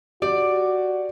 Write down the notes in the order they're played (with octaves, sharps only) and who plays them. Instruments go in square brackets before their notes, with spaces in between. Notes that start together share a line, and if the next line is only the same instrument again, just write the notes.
[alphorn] F#4 [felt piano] G4 [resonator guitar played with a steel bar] D5